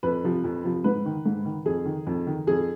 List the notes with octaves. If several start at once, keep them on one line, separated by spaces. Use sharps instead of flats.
F2 B4
C3 F3
F2
C3 F3
G#2 B4
D#3
G#2
D#3
F2 G#4
D#3
F2
D#3
F2 G#4